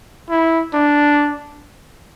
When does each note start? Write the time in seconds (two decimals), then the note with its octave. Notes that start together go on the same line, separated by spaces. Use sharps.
0.30 E4
0.74 D4